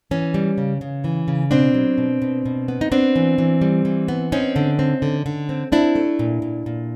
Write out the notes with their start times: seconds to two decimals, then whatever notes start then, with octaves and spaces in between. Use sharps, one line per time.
0.11 E3 C#4
0.34 G3
0.58 C#3
0.81 C#3
1.04 E3
1.28 C#3
1.51 B2 C4 D4
1.74 F#3
1.98 B2
2.22 B2
2.45 B2
2.68 B3
2.81 D#4
2.92 B3 C4 D4
3.16 E3
3.38 E3
3.61 G3
3.85 E3
4.08 B3
4.32 C4 C#4 D#4
4.56 D3
4.79 C4
5.02 D3
5.26 D3
5.49 C4
5.72 C4 D4 E4
5.95 A3
6.19 A#2
6.42 A#2
6.66 A#2